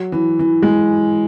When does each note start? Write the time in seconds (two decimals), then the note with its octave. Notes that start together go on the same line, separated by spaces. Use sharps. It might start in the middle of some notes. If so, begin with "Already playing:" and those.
Already playing: F#3
0.12 E3
0.39 E3
0.62 G#3